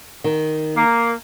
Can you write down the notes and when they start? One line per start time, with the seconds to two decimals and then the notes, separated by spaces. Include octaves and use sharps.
0.24 D#3
0.76 A#3